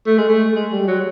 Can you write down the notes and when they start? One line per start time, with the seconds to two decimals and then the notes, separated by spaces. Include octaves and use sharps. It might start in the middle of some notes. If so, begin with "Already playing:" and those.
0.07 A3
0.18 G#3
0.28 A3
0.55 G#3
0.71 G3
0.88 F#3